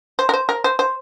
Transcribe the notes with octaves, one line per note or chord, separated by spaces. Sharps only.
C5
A#4
C5
A#4
C5
C5